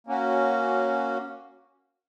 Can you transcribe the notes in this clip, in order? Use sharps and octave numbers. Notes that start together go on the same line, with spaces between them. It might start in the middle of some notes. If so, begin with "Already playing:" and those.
A#3 C#4 F#4